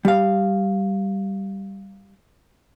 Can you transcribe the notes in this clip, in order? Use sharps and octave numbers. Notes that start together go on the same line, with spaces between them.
G3 F5